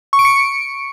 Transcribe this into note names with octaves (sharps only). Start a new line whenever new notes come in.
C#6
D7
C#7